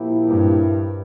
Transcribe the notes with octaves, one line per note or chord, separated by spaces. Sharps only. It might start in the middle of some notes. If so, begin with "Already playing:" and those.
Already playing: A#2 F3 A#3 E4 G4
G2